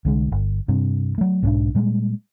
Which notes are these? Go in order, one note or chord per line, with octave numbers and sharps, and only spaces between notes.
C2 D3 G#3
G1
G2 C3
F#3 A3
B1 G#2 C#4 D4
A#2 G3 G#3